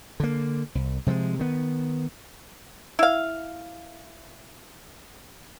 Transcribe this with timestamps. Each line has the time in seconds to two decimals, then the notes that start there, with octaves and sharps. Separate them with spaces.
0.20 D3 A#3
0.75 C2
1.06 C3 F3 G3 G#3
1.39 D#3 B3
2.99 E4 F5